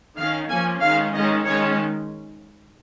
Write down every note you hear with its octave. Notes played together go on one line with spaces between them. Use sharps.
D#3 C#4 F5
F3 A#3 C#4 G#5
D#3 G#3 C#4 F5
D#3 G#3 C#4 D#5
D#3 G#3 C#4 C#5